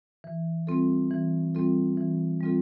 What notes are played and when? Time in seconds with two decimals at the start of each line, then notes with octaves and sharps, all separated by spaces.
0.24 E3
0.67 G3 C4 F4 A4
1.11 E3
1.55 G3 C4 F4 A4
1.97 E3
2.41 G3 C4 F4 A4